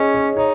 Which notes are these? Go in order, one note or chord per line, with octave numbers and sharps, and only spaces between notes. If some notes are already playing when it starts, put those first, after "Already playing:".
Already playing: C#4 G#4 D#5
C#5
D#4 C#5